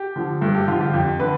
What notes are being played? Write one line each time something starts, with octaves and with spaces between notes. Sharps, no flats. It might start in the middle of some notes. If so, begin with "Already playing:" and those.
Already playing: G4
D3 F3
G2 A4
G4
D3 F3 F4
G4
F2
D3 B4